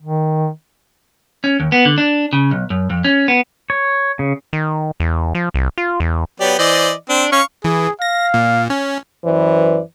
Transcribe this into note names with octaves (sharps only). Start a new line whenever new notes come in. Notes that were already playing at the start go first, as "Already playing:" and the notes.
D#3
C#4
D#2
B3
D3
D4
C#3
B1
F#2
F2
C#4
B3
C#5
C#3
D#3
E2
F3
C2
F4
E2
F#3 B3 G4 D5
E3 C5 D5 D#5
C4 D4
C#4 F5 C#6
E3 G#4
F5 A#6
A#2
C#4
F#2 E3 B4 C5 D5